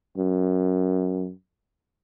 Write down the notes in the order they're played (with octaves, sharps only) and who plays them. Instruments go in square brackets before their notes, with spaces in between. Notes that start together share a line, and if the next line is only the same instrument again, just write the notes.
[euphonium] F#2